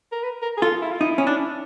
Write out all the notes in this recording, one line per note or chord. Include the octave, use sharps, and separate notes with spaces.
A#4
B4
A#4
G#4
F4 A4
E4
F4
D#4 E4
C#4
D4